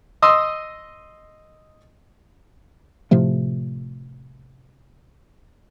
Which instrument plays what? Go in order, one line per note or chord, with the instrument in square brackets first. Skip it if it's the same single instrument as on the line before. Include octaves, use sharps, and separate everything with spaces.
[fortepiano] D#5 C6 D#6 E6
[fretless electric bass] A2 C3 F3 A3